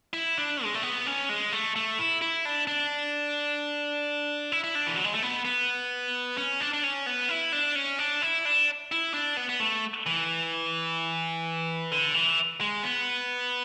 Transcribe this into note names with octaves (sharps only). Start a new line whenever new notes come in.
E4
D4
G#3
A3
B3
C#4
G#3
A3
A3
E4
E4
D4
D4
E4
E4
D4
E3
F#3
G#3
A3
B3
B3
C#4
D4
D4
C#4
B3
E4
D4
C#4
D4
E4
D4
E4
D4
B3
B3
A3
E3
D3
E3
G#3
B3